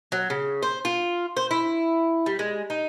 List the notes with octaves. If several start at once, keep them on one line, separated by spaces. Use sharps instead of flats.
F#3
C#3
C5
F4
C5
E4
G3
G#3
D#4